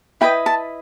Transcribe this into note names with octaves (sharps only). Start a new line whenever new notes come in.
E4 B4 D#5 G5
A5